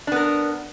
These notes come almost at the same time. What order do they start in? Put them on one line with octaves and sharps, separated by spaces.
D4 B3 A#4